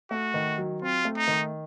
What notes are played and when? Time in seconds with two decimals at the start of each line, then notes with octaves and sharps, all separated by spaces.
0.11 A3 F#4
0.34 D#3
0.58 F#3
0.82 C4 F4
1.05 A3
1.17 D#4
1.28 D#3